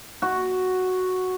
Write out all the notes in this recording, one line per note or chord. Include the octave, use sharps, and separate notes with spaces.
F#4